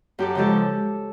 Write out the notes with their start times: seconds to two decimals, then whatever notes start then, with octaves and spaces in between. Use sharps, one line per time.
0.19 F#2 G4 A4
0.35 C#3 F3 G#3 G4 A4